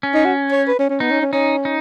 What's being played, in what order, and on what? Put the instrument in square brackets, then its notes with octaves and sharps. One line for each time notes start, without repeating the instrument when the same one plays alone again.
[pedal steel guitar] C#4
[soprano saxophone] D#4
F#4
C#5
B4
C#4
C#4
[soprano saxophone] B3 [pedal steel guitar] D#4
[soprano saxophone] C#4
C#4
[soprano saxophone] C#4 [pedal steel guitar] D#4
[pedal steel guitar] D#4